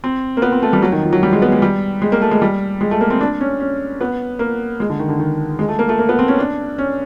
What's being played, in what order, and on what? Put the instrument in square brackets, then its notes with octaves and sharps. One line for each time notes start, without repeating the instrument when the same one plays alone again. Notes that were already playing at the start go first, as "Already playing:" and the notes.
[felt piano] C4
A#3
B3
C4
A3
G3
F#3
D#3
F3
F#3
G3
G#3
B3
G#3
G3
G#3
A#3
A3
G#3
G3
G#3
A3
A#3
C4
D4
C#4
C#4
B3
A#3
G#3
D3
D#3
D3
D#3
G#3
A3
A#3
A3
A#3
B3
C4
C#4
D4
C#4